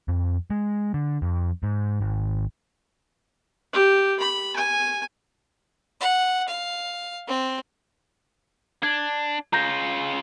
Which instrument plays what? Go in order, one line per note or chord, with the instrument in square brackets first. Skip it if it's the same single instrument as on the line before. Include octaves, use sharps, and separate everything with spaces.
[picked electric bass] F2
G#3
D3
F2
G#2
G#1
[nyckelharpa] G4
B5
G#5
[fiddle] F#5
F5
C4
[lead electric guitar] D4 [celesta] G#6
[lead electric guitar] C#3 F4 [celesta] A#5 G6 A#6